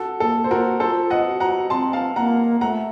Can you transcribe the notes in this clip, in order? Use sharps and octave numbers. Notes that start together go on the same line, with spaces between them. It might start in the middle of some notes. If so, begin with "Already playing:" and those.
Already playing: F#4 A4
A#3 A4
C5
A#3 F#4 A#4
F4 A4 C5
D#5 F#5
F#4
F#5 A#5
C4 A5 C6
F5 A5
A#3 F#5 A#5
A3 F#5 A#5